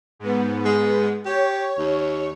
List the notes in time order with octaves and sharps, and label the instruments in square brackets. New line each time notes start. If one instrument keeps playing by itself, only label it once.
[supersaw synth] G#2 B3
[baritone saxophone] G#3
[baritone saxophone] G4 [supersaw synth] C#5
[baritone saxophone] D#2